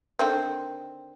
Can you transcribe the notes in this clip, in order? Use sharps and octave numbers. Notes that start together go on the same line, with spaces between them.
D3 D#3 C4